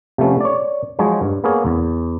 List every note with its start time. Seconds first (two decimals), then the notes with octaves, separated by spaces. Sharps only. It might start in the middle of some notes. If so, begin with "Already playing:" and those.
0.18 C3 F3 A3 B3 C#4
0.41 C#5 D5
0.99 F3 F#3 G#3 D#4 C#5
1.22 G2
1.44 A#3 B3 G#4 A#4 C#5
1.65 E2